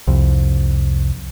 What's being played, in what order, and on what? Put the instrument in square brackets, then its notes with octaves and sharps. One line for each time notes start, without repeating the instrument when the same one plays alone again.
[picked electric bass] C2 F2